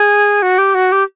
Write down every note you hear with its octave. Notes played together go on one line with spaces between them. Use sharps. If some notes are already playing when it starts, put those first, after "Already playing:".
Already playing: G#4
F#4
G4
F#4
G4